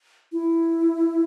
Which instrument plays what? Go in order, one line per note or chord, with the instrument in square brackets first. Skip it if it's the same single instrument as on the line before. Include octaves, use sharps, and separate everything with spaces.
[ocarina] E4